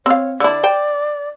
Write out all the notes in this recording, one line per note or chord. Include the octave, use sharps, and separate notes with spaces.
C4 C#5 F5
D3 E4 D5
C5 G5